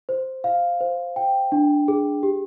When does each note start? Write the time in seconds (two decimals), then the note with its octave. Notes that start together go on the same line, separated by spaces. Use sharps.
0.09 C5
0.44 F5
0.81 C5
1.16 G5
1.52 D4
1.88 G#4
2.23 G4